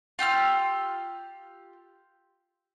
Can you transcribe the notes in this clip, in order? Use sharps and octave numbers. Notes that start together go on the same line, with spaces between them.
F4 G4 E6 F6